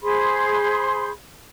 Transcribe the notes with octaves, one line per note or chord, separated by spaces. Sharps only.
G#4 C5 B5 C6